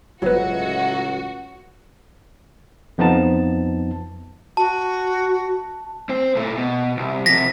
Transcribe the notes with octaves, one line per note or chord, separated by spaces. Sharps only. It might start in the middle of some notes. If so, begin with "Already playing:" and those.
G1 C#2 A2 F#3 F#4 B4
F2 F3 B3 D#4 A5
F#4 A5
C4 C5
A#2 A3
B2
C2
C3 F3 A#6 B6